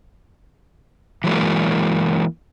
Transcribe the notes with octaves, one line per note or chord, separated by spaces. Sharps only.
E3 F#3 G#3 A#3